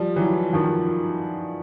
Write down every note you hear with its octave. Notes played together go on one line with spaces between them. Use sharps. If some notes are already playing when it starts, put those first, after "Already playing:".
Already playing: F3 G3
E3 F#3
D#3 F3